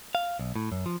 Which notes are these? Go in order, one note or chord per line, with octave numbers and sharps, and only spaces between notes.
F5
B1
A2
F#2
F3